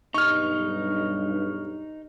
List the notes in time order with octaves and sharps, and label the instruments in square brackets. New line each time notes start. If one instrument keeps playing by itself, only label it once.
[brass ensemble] B1 G2 [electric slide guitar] D#4 [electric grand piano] C#6 F6